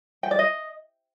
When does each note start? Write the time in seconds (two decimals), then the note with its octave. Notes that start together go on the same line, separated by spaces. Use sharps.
0.23 G5
0.31 D5
0.39 D#5